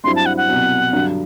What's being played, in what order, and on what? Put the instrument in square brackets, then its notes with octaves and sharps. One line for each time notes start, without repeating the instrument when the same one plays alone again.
[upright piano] G2 F#3 C4 E4 [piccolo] C6
[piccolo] A5
F#5
F#5
[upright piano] C2 B2 F#3
G2 D3 F#3